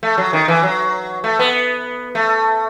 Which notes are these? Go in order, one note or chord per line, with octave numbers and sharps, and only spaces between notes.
A3
F#3
D#3
E3
F#3
A3
B3
A3